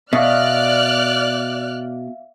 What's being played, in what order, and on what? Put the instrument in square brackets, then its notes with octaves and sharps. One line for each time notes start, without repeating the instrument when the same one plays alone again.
[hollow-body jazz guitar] B2 [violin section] D5 F6 F#6 [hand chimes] E5 F5